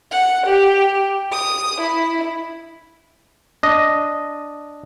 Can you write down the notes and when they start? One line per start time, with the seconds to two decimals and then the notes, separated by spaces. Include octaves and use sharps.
0.11 F#5
0.45 G4
1.31 D#6
1.80 E4
3.63 D4 D#5